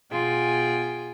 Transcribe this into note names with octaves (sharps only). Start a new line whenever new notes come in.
B2 F4 G#4 G5 G#5